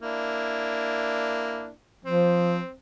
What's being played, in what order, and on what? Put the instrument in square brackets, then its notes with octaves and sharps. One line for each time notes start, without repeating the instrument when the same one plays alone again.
[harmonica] A#3 D4 E4
[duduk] F3 [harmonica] C4